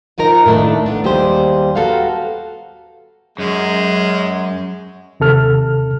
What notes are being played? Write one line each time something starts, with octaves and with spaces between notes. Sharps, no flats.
D#3 F3 D#4 A#4 A#5
A2 D#3 A3 A#3 D4
B3 D4
D#2 G3 G4 G#4 C5
B3 F#4 A4 A#4 F5 G5
F#2 G#3
D#2 C3 A4 F6